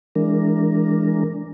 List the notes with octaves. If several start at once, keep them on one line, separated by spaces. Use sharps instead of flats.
E3 G#3 D4 A#4